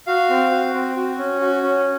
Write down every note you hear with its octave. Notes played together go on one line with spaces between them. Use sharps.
F#4 F5
C4
F#4
C4
F#4
C#4
F#4
C#4